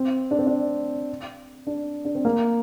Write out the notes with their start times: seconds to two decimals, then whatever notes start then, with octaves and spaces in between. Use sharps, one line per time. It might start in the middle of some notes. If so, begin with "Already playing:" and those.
Already playing: C4
0.31 D4
0.39 C4
0.47 D4
1.67 D4
2.05 D4
2.15 C4
2.25 A#3